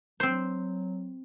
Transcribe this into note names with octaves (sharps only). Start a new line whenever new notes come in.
F#3 C4 C5